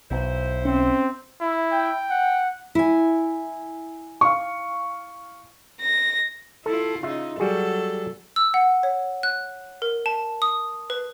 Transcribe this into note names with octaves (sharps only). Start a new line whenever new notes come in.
B1 E4 C5
C4 C#4
E4
G5
F#5
E4 G#5
F5 C#6
A#6
E4 F4 A4 A5
C#3 D#4 F4 E5
F#3 G3 F#4 G#4 A4
E6
F#5
C#5
F#6
A#4
A5
D#6
B4